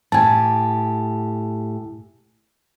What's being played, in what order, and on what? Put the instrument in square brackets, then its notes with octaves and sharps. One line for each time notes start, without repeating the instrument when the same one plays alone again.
[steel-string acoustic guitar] A2 G4 [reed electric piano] G#5 A5